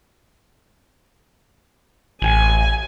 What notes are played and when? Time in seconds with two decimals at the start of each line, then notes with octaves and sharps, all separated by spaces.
2.22 A1 G#5